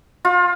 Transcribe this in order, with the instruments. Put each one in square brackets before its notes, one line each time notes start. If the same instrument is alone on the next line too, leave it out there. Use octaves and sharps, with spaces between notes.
[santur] F4